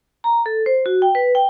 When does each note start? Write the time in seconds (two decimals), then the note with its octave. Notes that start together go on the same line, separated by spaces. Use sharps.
0.24 A#5
0.46 A4
0.66 C5
0.86 F#4
1.02 G5
1.15 B4
1.35 G5